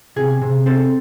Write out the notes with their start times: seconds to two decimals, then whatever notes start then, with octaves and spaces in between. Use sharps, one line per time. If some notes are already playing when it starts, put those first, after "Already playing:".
0.16 C3 G#4
0.42 C3
0.66 C4 A4